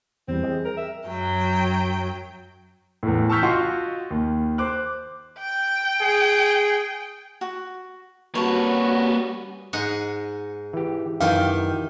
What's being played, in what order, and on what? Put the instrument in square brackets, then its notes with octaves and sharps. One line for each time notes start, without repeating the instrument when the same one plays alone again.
[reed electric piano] E2 E3 G3 [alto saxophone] C4
[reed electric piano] G#4 D#5 G5
[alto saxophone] A#4
E5
[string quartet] F#2 F#3 G5
[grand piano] E2 A2
A5 C#6 E6 F6 G6 B6
F4 F#4 D#5 F#5 C6 C#6
D#2
C5 D6 F#6
[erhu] G5
[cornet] G#4
[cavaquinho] F#4
[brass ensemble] G3 C#4 [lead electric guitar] A#3 B4 [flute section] F#4 [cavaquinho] C#5 A5
[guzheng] G#2 D#5 F#5
[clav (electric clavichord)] E3 G4
[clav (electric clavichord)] F#2 E3 [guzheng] D#3 G4 [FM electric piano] F5 G5